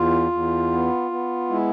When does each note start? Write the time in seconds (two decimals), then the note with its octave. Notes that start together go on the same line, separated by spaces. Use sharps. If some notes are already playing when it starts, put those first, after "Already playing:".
Already playing: E2 F4
0.31 E2
0.72 B3
1.11 B3
1.50 G#3 E4